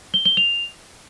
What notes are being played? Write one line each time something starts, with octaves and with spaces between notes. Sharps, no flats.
G7
G7
F7